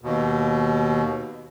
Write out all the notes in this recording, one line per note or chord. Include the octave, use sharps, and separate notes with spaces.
D#2 B2